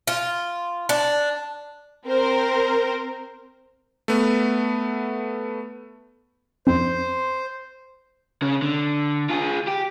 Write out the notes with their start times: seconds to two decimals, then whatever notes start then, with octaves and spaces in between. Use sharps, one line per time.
0.07 F4
0.89 D4
2.07 C4 A#4 C5
4.08 A3 B3
6.67 F2 C5
8.42 C#3
8.62 D3
9.30 F4 G#4
9.68 G4